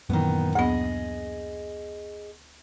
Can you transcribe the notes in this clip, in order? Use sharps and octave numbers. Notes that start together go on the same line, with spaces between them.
F#2 A#2 D#3 E3 B3
D2 B3 G#4 D#5